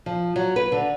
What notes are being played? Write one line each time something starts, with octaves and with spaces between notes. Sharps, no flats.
F3
F#3
B4
D3